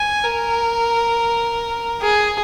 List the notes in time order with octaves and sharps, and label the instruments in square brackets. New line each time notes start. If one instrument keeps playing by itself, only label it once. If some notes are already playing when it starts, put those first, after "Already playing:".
Already playing: [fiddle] G#5
A#4
G#4